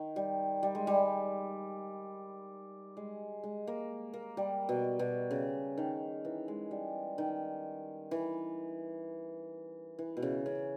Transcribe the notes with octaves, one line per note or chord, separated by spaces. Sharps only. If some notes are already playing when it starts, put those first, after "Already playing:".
Already playing: D#3
G3
G3
G#3
G3
G#3
G#3
A#3
A#3
G3
B2
B2
C#3
D#3
E3
G#3
G3
D#3
E3
E3
B2
C#3
C#3